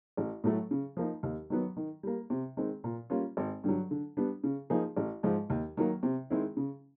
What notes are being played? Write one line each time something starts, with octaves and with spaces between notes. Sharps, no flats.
A1
A2 F#3 A3
C#3
F3 A#3 D#4
D#2
D#3 F#3 B3
D#3
G3 A#3
C3
D#3 G#3 C4
A#2
G3 A#3 C#4 F4
G#1
G2 D3 F#3
D3
G3 B3 D4
C#3
F3 A#3 D#4 G#4
A1
G#2 F3 G#3
D#2
D#3 F#3 A#3
C3
D#3 G#3 C4 E4
C#3